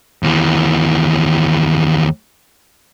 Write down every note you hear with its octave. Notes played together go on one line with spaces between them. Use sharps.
D#2 E3